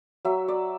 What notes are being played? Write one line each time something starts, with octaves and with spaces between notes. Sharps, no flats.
F#3 E5
D5